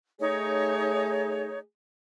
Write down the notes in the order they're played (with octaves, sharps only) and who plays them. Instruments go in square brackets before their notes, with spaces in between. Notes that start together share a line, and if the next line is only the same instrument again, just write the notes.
[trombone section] A3 G#4 [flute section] D#4 C#5